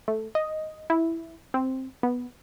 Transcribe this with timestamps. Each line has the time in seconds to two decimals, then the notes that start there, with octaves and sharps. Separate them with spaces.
0.08 A3
0.35 D#5
0.90 E4
1.54 C4
2.03 B3